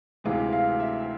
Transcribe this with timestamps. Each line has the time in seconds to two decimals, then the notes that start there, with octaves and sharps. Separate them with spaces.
0.24 D2 C3 E3 G#3 F5
0.52 F5
0.80 E5